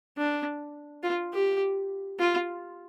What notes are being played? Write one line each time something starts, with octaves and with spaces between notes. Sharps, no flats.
D4
F4
G4
F4